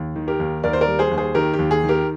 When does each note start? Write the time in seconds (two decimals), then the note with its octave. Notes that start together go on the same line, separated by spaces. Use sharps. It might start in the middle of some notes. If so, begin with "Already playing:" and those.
Already playing: D#2
0.16 D#3
0.28 G4 A#4
0.40 D#2
0.64 D#2 A#4 D5
0.73 C5
0.81 A#4 D5
0.87 G3
0.99 G#4 C5
1.11 D#2
1.18 G#4 C5
1.35 D#3 G4 A#4
1.54 G4
1.59 D#2
1.71 G#4
1.84 D#3
1.89 G4 A#4